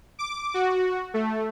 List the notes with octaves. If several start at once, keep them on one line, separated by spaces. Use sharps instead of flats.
D6
F#4
A3